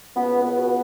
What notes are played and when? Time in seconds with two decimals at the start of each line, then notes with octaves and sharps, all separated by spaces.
0.16 C#2 B3
0.36 C#2
0.42 B3
0.55 B2
0.67 B3